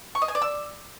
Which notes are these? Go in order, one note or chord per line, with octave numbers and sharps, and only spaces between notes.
C#6
D#5
G#5
D5
E6